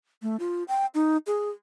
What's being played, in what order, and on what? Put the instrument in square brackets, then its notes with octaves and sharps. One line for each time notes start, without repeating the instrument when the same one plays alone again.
[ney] A3
F4
G5
D#4
G#4